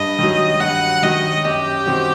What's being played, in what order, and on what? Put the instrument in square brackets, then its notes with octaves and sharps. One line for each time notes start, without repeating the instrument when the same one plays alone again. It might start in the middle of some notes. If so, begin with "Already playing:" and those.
Already playing: [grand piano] G2 [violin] D#5
[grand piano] D#3 F#3
[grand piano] G2 [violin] F#5
[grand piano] D#3 F#3 [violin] D#5
[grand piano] F#2 [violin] G4
[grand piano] D#3 G3 C4 F#4